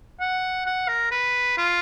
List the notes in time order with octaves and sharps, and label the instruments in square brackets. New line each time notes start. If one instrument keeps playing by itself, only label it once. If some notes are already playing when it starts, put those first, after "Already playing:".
[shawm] F#5
F#5
A#4
B4
F4